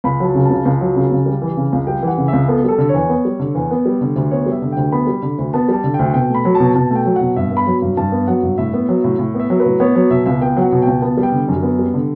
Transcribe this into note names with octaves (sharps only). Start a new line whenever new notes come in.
C#2 B5
F#3 A5
C#3
C#2 A5
C#2
F#3
C#3
C#2
G3
E3
C#3
C#2
G3 G5
E3 F#5
C#3
E5
C#2
B3 A4
G3 A4
D3
E2 C#5
B3
G3
D3
E2
B3
G3
D3
D2
B3 C#5
G3
E5
D3
D2 G5
B3 B5
G3
D3
D2
B3 A5
G3 A5
D3
G5
D2
B2 G5
A3
B5
F#3
B2 A5
B2 A5
A3 G5
F#3
B2 F#5
G2 E5
B3
B5
F#3
G2
G2 A5
B3
F#3 F#5
G2
A2 E5
B3
F#3
A2
A2
B3
E5
F#3
B4
A2
B3 C#5
F#3 C#5
B2 E5
C#2 E5
B3 G5
F#3 F#5
B2
C#2 G5
B3 A5
G3
G5
D3
F#2
B3
G3
D3